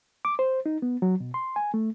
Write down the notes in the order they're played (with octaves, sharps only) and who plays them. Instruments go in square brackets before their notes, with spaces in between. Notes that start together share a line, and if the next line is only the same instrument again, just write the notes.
[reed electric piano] D6
C5
D#4
B3
F#3
B2
C6
G#5
A3